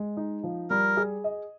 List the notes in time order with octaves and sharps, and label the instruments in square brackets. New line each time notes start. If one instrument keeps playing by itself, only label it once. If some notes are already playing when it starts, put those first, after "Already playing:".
Already playing: [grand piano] G#3
D#4
F3
[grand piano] G3 [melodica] A#4
[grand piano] G#4
D#5